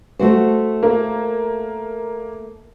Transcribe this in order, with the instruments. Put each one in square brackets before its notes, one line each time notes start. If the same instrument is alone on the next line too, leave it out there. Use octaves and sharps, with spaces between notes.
[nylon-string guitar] A3 F#4 C5
[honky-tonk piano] A#3